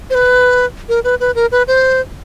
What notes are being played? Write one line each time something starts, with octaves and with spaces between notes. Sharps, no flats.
C5
B4
A#4
B4
B4
A#4
B4
C5